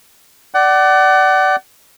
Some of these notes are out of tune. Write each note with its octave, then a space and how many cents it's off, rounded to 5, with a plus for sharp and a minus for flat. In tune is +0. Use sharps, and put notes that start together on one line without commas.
D5 +0 F#5 +35